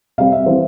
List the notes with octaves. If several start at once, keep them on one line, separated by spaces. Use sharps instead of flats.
C3 G3 C4 F5
E5
E3 G3 B3 C5